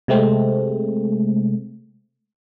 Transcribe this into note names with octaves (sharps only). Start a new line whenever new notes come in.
C3 G#3 A3 C4